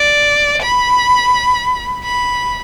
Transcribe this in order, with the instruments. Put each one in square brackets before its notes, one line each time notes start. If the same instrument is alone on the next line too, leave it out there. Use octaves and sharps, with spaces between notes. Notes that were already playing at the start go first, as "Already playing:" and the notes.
Already playing: [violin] D5
B5
B5